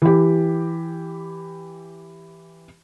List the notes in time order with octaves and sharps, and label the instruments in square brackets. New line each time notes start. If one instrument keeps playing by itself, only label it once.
[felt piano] E3 G4